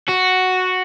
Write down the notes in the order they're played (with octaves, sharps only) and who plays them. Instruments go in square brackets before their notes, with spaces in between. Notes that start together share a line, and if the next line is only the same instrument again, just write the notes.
[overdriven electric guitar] F#4